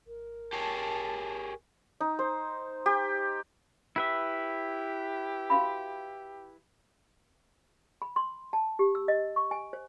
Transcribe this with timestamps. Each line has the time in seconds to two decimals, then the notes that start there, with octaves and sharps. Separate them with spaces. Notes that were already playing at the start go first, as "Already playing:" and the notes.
0.07 G#1 A#4
0.53 G4 G#4 C#5 A5
2.00 D#4
2.19 C5
2.86 G4
3.96 E4 G4 B4 E5
5.50 F#4 F5 B5
8.02 B5
8.16 C6
8.53 A5
8.79 G4
8.95 E6
9.08 D#5
9.36 C#6
9.51 G#5
9.73 C5